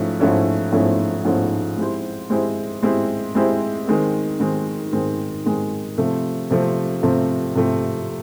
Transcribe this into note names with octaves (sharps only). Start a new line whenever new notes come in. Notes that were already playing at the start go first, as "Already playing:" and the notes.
Already playing: G#2 F3 A3 C#4 E4
G#2 F3 A3 C#4 E4
G#2 F3 A3 C#4 E4
G#2 F3 A3 C#4 E4
G#3 C4 E4 G4 C5
G#3 C4 E4 G4 C5
G#3 C4 E4 G4 C5
G#3 C4 E4 G4 C5
D#3 G#3 C4
D#3 G#3 C4
D#3 G#3 C4
D#3 G#3 C4
C3 F3 A3 C4
C3 F3 A3 C4
C3 F3 A3 C4
C3 F3 A3 C4